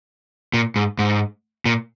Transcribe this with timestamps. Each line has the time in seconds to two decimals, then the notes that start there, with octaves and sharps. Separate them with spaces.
0.54 A#2
0.76 G#2
0.99 G#2
1.66 A#2